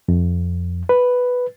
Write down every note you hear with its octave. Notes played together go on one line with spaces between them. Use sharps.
F2
B4